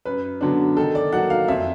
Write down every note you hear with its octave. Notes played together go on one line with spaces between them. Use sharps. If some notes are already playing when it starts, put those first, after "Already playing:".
F#2 B4
D3 F#3 B3 D4
D#3 A4
D5
F#3 A#3 F#5
F5
F2 E5